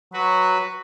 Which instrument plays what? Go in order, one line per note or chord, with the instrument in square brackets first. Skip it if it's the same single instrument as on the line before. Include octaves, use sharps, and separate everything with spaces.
[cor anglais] F#3 [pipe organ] F#4 B4